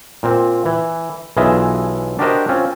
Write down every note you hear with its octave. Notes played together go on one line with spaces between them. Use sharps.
A#2 C4
E3
B1 E3 F4 G#4 D#5 E5
D4 F#4 G4 A#4 C5 D#5
C4 C#4 F4